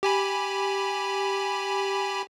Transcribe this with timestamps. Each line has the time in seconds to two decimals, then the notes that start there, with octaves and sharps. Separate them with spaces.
0.03 G4 G#5 B5